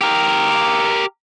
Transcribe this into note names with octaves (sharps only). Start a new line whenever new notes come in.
G4 A#4